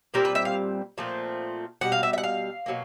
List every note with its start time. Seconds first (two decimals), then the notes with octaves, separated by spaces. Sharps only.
0.14 A#2 G3 C4 A#4
0.25 B4
0.35 E5
0.45 F5
0.98 A#2 F3 A3 C4
1.81 B2 G3 F#5
1.92 F5
2.03 E5
2.13 E5
2.18 F#5
2.23 F5
2.66 B2 F#3 A#3